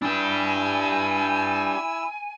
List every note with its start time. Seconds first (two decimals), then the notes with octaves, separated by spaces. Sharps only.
0.02 D4 E4 G4 G#5 E6